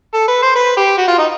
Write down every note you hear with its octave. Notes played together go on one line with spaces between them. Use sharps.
A4
B4
C5
B4
G4
F#4
F4
D#4